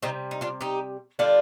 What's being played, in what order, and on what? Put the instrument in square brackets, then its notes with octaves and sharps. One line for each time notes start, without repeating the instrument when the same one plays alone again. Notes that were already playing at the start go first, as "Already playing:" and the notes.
[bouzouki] C3 G3 C4 D#4
D#4
D4 F4
D#4 G4
D3 G3 D4 F4